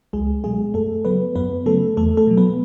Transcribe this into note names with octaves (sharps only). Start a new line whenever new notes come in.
C#2 G#3 G#4
B2 F#3 G#3 G#4
F#2 A3 A4
C#3 F#3 B3 B4
F#2 B3 B4
C#3 F#3 A3 A4
E2 A3 A4
A3 A4
B2 F#3
B3 B4